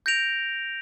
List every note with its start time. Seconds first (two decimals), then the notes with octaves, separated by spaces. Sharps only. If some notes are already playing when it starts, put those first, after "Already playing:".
0.06 G6 A#6 D7 F7